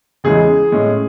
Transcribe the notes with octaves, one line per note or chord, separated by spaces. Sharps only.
E2 C#3 E3 G#3 G#4
A2 G#3 C#4